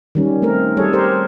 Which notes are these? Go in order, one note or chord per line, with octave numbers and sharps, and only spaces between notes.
D#3 G3 C#4
A3 C4 D#4 A#4
G3 G#4 A4 C#5
G4 A#4 C5